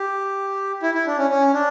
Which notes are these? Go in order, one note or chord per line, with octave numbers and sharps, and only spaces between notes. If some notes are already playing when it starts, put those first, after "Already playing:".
Already playing: G4
E4
E4
D4
C#4
C#4
D4